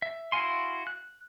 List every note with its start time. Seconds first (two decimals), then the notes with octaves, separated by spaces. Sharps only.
0.02 E5
0.32 E4 F#4 F5 G#5 C6
0.87 F#6